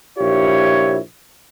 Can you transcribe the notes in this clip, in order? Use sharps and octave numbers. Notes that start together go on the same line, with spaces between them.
A#1 E4 F4 G4 C#5